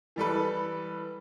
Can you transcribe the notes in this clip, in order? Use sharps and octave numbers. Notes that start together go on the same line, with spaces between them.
E3 G3 A4 B4